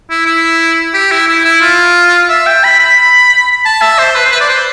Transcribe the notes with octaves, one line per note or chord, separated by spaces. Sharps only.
E4
E4
G4
E4
E4
E4
F4
E5
G5
B5
B5
A5
E5
C5
B4
C5
B4
D5
C5